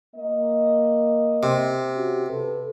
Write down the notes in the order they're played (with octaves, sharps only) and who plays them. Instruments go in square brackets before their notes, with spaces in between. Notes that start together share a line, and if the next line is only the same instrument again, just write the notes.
[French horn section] A#3 D#5
[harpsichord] C3
[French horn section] C#4 F#4 G4
A4 B4